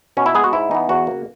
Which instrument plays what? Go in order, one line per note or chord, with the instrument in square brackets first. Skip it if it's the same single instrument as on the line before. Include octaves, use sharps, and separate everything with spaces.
[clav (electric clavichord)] B2 C#4
E4
G#3 B3 G#4
F#4
G#2 E4
E3 B3 D#4
E2 F#4
C#3 F#3 A#3